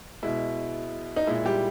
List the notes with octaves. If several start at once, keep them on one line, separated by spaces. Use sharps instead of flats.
B2 G#3 E4
D#4
A#2 G#3 E4
G3 G4